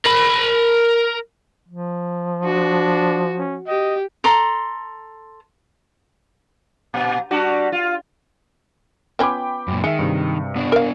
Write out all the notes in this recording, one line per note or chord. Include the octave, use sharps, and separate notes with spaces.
A#4 B5
F3
D4 F#4
C#4
G4 D#5
A4 A#5 C6
A#2
G3 D4 F#4
F4
B3 C#4 F4 G5 B5 D6
F#2 A#2
D#3 G#3 E5 C#7
G2 C3
B3 D4 D5
A#4 F5